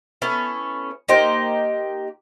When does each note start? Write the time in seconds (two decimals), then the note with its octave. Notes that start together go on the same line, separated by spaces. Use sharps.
0.22 A3 B3 C#4 E4
1.08 A#3 D#4 G4 C5